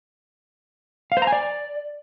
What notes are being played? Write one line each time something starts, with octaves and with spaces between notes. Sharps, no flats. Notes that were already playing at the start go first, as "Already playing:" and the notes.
F5
C5
A#5
G#5
D5